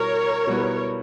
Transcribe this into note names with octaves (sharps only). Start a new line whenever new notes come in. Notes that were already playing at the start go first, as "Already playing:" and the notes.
Already playing: B2 G3 B3 E4 A#4 C#5
B2 G3 B3 E4